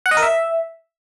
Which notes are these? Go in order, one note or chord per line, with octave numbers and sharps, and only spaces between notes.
F#5
D#5
A#4
E5